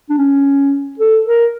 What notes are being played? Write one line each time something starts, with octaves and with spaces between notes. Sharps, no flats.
D4
C#4
A4
A#4